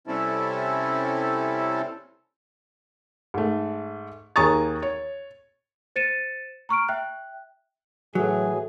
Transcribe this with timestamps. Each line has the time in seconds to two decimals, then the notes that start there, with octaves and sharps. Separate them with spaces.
0.07 C3 G3 C4 C#4 E4 A4
3.34 G#2 A3
4.36 D#2 G#4 A#5 C#6 D#6 A6
4.82 C#5
5.96 C5 A6 C#7 D#7 E7
6.69 A#5 C#6 F6 D7
6.89 E5 G5 F#6
8.15 A2 E3 F#3 G#4